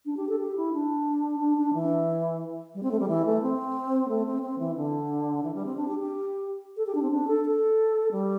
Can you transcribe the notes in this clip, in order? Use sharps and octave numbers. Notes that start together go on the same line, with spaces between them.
D4
G4
A4
G4
E4
D4
D4
D4
E3
G3
C4
A3
G3
E3
A3
C4
A3
C4
C4
E3
D3
E3
G3
C4
D4
G4
G4
A4
G4
D4
C4
D4
A4
A4
G3